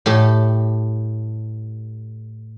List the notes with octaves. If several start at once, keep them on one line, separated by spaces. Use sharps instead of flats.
A2 G4 A4